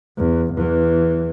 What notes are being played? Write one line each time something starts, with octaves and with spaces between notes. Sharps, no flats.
E2
E2 E3